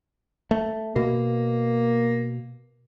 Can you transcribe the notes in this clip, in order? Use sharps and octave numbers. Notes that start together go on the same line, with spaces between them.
A3
B2 A#3